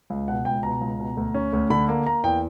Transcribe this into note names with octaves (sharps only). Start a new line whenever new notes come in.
C#2
B2 F#5
C#2 G5
B2 A#5
C#2
B2
D2
C#4
D2
D3 B5
A#3
A#3 A#5
E2 G5